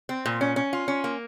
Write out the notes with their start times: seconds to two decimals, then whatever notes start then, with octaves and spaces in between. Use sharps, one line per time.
0.09 C4
0.26 A#2
0.41 C#4
0.56 C#4
0.73 F4
0.88 C#4
1.04 A#3